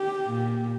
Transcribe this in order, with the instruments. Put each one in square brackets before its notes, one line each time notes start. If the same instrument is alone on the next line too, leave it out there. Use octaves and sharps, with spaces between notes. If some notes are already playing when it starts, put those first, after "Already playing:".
Already playing: [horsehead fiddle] G4
[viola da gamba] A#2